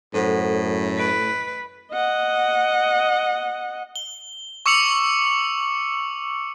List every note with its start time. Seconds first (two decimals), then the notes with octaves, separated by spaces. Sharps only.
0.14 F#2 A2 A4 C5 F#5
0.98 B4 D#5 D7
1.92 D#5 F#5
3.96 G7
4.66 C#6 D6 E6 C#7 F7 F#7